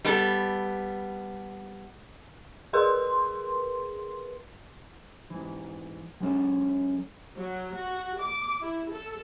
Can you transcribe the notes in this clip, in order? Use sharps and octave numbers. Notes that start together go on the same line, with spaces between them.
G3 B3 A4
G#4 A#4 B4 C6
G#2 E3
F#3 G#3 C#4 A4 C#5
F#3
F#4
D6
E4
A4